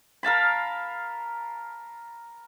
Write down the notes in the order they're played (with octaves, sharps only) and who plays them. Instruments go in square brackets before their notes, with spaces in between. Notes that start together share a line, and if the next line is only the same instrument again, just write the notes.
[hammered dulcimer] A#4 F5 A5 B5